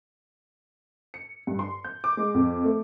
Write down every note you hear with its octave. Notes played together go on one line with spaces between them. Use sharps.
C#7
G2
C6
G6
D6
G#3
F2
A3